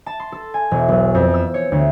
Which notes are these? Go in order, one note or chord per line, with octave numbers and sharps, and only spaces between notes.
A5
C6
A4
G#5
E1
B1
F2
E6
C#5
D2